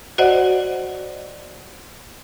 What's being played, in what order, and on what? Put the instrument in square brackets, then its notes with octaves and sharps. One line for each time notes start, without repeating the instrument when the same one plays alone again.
[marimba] F#4 C5 D5 D#5 F#5